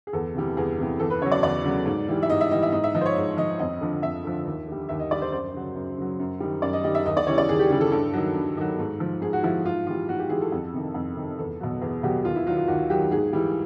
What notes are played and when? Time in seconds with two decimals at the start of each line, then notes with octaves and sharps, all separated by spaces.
0.07 G#4
0.13 E2 A4
0.35 C3 E3 G3
0.57 E2 G#4
0.78 C3 E3 G3
0.99 E2 A4
1.10 B4
1.22 C#3 F#3 C#5
1.32 D5
1.43 E2 D5
1.64 C#3 F#3
1.86 G#2
2.08 E3 G3
2.22 E5
2.30 G#2 D#5
2.41 E5
2.51 E3 G3 D#5
2.63 E5
2.72 G#2 D#5
2.84 E5
2.94 F3 D#5
3.01 C5
3.06 C#5
3.16 G#2
3.37 F3 D#5
3.59 F2 D#5
3.81 D3 F3
4.02 F2 E5
4.24 D3 F3
4.46 D#2
4.67 D3 G3
4.89 D#2 E5
4.99 D#5
5.11 D3 G3 D5
5.22 C5
5.32 F#2 C5
5.54 C#3 F#3
5.76 F#2
5.97 C#3 F#3
6.19 F#2
6.40 D#3 G3
6.62 F#2 D5
6.73 D#5
6.84 D#3 G3 D#5
6.95 E5
7.06 D#2 D#5
7.17 D5
7.27 C#3 E3 G3 C#5
7.38 D5
7.49 D#2 G#4
7.59 G4
7.70 C#3 E3 G3 G#4
7.81 A4
7.91 G2 A4
8.13 D#3 F#3
8.35 G2
8.57 D#3 F#3
8.79 G#2
9.00 F3
9.22 G#2 G#4
9.33 F#4
9.43 F3 E4
9.65 G#2 F4
9.87 E3 G3 F4
10.08 G#2 F#4
10.19 G4
10.29 E3 G3 G#4
10.41 A4
10.52 F2
10.74 C3 D#3
10.94 F2
11.16 C3 D#3
11.38 E2 A4
11.60 B2 F#3
11.81 E2 G#4
12.03 B2 F#3 G4
12.25 D#2 F4
12.36 E4
12.47 D#3 F#3 F4
12.57 F4
12.68 D#2 F#4
12.90 D#3 F#3 G4
13.11 G#2 G#4
13.33 E3 G3